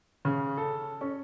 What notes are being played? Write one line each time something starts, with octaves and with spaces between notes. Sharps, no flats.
C#3
A4
C#4